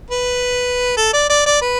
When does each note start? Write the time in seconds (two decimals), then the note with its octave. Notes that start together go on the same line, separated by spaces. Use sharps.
0.10 B4
0.97 A4
1.13 D5
1.29 D5
1.46 D5
1.62 B4